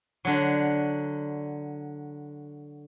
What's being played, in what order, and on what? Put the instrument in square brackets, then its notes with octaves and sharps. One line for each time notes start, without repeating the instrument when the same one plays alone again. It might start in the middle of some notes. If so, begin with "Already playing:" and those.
[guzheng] D3 F#3